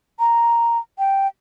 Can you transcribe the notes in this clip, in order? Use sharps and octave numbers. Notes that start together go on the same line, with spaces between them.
A#5
G5